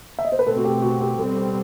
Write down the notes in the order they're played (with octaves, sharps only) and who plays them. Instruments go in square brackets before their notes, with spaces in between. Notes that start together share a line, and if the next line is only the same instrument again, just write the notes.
[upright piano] E5
D#5
C5
B4
[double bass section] B2 A3 C4 [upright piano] A4
[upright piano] F#4
G4
F#4
G4
[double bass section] B2 G3 C4 [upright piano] A4
[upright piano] G4